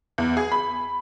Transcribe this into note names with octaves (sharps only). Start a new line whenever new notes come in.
E2
G#4
B5